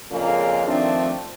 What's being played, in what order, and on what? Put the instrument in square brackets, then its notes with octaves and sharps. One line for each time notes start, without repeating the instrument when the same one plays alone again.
[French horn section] F2 A#2 C#3 G#3 A#3 F4
D#3 F3 A3 C4 D4